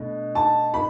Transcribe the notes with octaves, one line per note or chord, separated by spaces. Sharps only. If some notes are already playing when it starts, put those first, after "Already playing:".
Already playing: B2 A3 D4
A5
B5